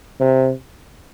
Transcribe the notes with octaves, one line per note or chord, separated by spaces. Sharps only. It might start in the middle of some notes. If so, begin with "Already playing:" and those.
C3